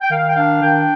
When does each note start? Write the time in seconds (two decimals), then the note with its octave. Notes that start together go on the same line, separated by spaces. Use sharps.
0.01 G5
0.10 D#3 F5
0.29 G5
0.35 D4 F5
0.61 D#3 G5